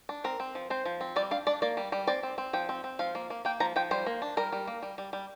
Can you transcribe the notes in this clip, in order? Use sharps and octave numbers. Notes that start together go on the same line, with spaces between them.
D4
C4 A#4
C4
F3
C4 C5
F3
C4
G3 D5
D4 F5
D4 D5
A#3 D5
G3
G3
C4 D5
C4
C4
F3 G5
C4
C4
F3 F5
A#3
A#3
A#3 G5
F3 A#5
F3 G5
G3 C5
A#3
D4
G3 A#4
G3
A#3
G3
G3
G3